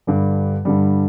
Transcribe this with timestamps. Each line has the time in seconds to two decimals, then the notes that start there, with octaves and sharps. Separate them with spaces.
0.07 G2 D3 G3
0.65 G2 D3 G3